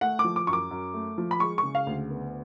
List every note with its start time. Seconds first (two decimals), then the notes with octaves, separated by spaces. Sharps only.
0.01 A3 F#5
0.19 D6
0.24 F3
0.36 D6
0.47 F#2 C#6
0.53 D6
0.71 F#2
0.94 A3
1.18 F3
1.31 B5
1.40 G#3 C#6
1.58 C#6
1.63 C#3
1.75 F5
1.87 D2
2.10 B3